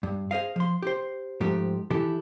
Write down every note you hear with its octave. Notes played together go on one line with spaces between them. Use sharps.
G2
G#4 C5 D#5 F5
F3 C6
G4 C5
G#2 F3 A3 G4
D#3 E3 E4 G4 A4